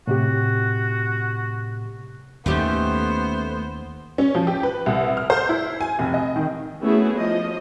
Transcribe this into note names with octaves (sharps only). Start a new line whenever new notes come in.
A2 C3 F#4 G4
D#2 D#3 A3 B3 C#4 G4 C5
C#4
F3
G4
B4
C2
F6
C5
E4
G#5
F1
D#5
D#3
A3 B3 C#4 E4 F#4 G#4
F3 D#5